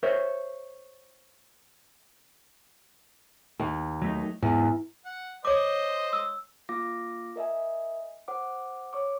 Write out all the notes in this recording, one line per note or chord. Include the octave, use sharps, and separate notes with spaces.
A#4 C5 C#5 E5
D#2
F#3 A3 D#4
E2 G#2
F#5
C5 C#5 D#5 C6 D6
E6
A#3 F4 F5 D6 A#6
A#4 D#5 E5 G#5
C5 F#5 D6
C#5 C#6 D6